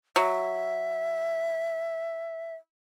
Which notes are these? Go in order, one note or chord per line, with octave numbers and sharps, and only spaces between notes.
F#3 E5